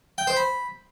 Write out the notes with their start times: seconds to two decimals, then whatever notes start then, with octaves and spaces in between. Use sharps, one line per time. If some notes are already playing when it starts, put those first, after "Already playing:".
0.18 G5
0.27 C5
0.37 B5